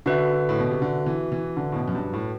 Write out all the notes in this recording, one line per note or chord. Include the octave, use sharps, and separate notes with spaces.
D3 F#4 B4 E5
A2
B2
C3
D3
E3
E3
D3
A2
B2
F#2
G2
A2